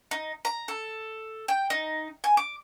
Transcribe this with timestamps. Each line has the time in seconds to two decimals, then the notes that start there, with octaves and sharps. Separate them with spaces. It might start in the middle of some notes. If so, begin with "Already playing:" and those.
0.11 D#4
0.45 A#5
0.68 A4
1.48 G5
1.70 D#4
2.24 G#5
2.37 D6